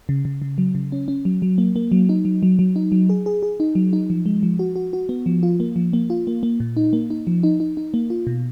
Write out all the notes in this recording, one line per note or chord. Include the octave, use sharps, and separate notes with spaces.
C#3
C#3
C#3
F#3
C#3
C#4
C#4
F#3
F#3
A#3
A#3
F#3
D#4
F#3
F#3
F#3
D#4
F#3
G#4
G#4
G#4
D#4
F#3
D#4
F3
G#3
F3
F#4
F#4
F#4
B3
F3
F4
A#3
F3
A#3
F4
A#3
A#3
A#2
D#4
A#3
D#4
F3
D#4
D#4
D#4
A#3
F4
B2